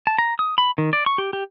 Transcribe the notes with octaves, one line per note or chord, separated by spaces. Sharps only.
A5
A#5
D#6
B5
D#3
D5
C#6
G4
G4